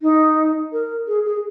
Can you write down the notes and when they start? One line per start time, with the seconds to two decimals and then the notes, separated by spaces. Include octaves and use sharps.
0.02 D#4
0.72 A#4
1.08 G#4
1.25 G#4